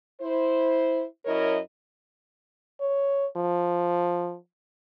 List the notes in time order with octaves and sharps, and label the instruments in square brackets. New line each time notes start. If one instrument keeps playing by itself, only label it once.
[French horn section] E4 C5
F#2 E4 A#4 C#5 D#5
[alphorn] C#5
F3